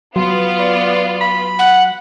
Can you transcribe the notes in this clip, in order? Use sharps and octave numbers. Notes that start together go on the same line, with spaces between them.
F#3 B3 F4 C6
D5
B5
F#5